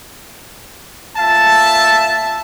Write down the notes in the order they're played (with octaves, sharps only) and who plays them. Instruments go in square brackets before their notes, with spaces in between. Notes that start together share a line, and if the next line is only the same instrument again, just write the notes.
[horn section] A#2 E5 A5